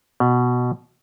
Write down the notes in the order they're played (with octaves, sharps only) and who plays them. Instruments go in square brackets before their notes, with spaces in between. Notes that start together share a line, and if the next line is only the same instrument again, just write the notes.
[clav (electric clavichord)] B2